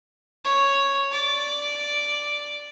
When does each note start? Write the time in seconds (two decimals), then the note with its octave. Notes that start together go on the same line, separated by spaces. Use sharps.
0.45 C#5
1.12 D5